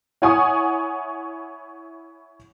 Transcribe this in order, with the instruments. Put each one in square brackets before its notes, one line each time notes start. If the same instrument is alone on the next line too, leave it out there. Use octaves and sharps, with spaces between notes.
[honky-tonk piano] E4 C#5 F#5 G#5 C#6 D#6